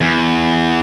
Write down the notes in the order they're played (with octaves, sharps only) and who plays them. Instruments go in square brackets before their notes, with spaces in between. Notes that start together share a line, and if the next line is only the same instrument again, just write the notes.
[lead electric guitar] E2